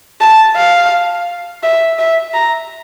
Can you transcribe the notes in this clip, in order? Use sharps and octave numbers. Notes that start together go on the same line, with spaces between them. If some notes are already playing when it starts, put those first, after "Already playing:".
A5
F5
E5
E5
A#5